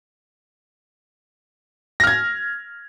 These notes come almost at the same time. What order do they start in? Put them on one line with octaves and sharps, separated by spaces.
A#6 F6 G#6